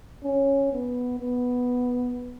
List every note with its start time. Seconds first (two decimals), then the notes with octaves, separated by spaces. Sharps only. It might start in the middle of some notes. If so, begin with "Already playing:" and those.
0.24 C#4
0.72 B3
1.20 B3